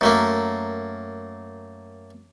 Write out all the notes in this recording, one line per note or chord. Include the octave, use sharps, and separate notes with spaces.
F#2 A3 A#3